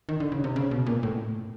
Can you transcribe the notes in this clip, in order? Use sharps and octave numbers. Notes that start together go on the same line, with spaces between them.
D#3
D3
C#3
C3
C#3
B2
A#2
A2